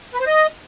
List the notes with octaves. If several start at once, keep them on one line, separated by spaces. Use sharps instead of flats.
B4
C5
D#5